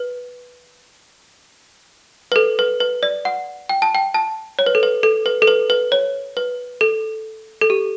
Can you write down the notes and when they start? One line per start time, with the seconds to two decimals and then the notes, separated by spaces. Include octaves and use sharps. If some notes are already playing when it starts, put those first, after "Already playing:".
Already playing: B4
2.32 B4
2.36 A4
2.59 B4
2.80 B4
3.03 D5
3.25 F#5
3.69 G5
3.82 A5
3.95 G5
4.14 A5
4.59 C#5
4.66 B4
4.75 A4
4.83 B4
5.03 A4
5.26 B4
5.42 A4
5.47 B4
5.70 B4
5.92 C#5
6.37 B4
6.81 A4
7.61 A4
7.70 G4